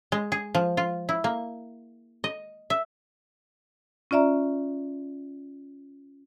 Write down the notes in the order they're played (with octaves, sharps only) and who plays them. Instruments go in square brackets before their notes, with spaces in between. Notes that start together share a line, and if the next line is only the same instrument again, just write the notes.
[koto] G#3
G#4
F3
F4
E4
A#3
D#5
E5
[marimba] C#4 F4 D5 E5 A#5